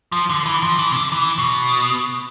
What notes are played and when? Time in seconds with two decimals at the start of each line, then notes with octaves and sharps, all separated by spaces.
0.12 F3
0.30 D3
0.46 E3
0.63 F3
0.79 E3
0.92 C3
0.96 D3
1.12 E3
1.38 B2